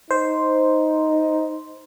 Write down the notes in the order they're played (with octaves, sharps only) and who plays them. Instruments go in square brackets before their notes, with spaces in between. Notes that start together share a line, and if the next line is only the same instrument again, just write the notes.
[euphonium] D#4 [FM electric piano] C5